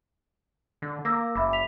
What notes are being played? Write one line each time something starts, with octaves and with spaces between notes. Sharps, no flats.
D3
A#3 D6 E6 A#6
F#1 E5 B5 D6
B6 F7